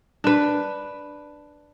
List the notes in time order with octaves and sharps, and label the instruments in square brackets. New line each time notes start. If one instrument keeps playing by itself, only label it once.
[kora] D4 B4